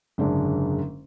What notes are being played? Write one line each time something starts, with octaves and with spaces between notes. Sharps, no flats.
F#1 G#2 D3 G#3 D4